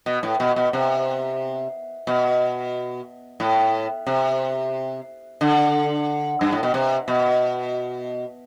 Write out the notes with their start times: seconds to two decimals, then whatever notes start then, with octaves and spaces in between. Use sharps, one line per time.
0.06 B2
0.23 A2
0.40 B2
0.56 B2
0.73 C3
2.07 B2
3.40 A2
4.06 C3
5.41 D3
6.41 G2
6.52 A2
6.63 B2
6.74 C3
7.08 B2